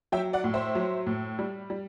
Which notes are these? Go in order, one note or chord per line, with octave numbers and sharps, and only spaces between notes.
F#3 E5 G5
D5 F#5
A2
C5 E5
F#3
A2
G3
G3